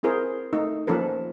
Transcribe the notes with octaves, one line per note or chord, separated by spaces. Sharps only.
C4 E4 G#4 A#4 C5
A3 D#4
F3 A#3 C#4 A4 B4